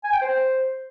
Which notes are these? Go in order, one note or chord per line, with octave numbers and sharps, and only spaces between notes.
G#5
G5
C5